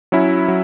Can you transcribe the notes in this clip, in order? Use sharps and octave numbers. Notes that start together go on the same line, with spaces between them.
F#3 C#4 E4
F#3